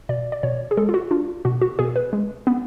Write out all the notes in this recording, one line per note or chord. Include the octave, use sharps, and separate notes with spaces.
B2 D5
D5
B2 C#5
G#4
G#3 A4
F4
F#4
D4 F4
B2 F#4
F#4
B2 G#4
B4
G#3
B3